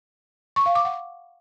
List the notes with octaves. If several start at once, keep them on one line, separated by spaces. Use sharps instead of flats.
C#6
F5
D6
F#5